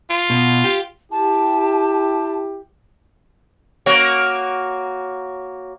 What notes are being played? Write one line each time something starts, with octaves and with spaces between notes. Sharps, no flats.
F4
B2
G4
E4 G4 A5
A#3 F#4 C#5